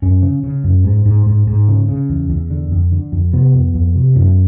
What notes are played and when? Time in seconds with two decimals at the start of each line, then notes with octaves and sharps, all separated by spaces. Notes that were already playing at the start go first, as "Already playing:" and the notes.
0.02 F#2 C#4
0.22 C#3
0.43 C#3
0.64 F#2
0.84 G#2
1.05 G#2
1.26 G#2
1.47 G#2
1.68 C#3
1.88 C#3
2.09 E2
2.30 E2
2.50 D3
2.71 F2
2.92 D3
3.12 F2
3.33 C3 B3
3.54 F2
3.75 F2
3.95 C3
4.16 F#2